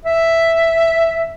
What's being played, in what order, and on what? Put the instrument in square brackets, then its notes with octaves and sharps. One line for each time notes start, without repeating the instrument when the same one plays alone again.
[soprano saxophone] E5